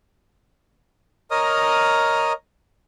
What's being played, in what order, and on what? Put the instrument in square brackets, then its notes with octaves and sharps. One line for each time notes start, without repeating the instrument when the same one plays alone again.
[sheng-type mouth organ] A#4 C#5 D#5 A#5 D#6 F6